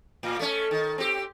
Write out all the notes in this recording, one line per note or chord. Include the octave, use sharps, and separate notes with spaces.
A2
A3 C#4
D#3
C4 G4